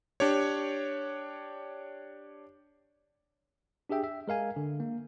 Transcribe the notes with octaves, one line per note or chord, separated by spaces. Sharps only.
D4 G4 C#5
D4 G4 G#4 E5 G5
E5
G#3 A#4 F5 G#5
D3
A#3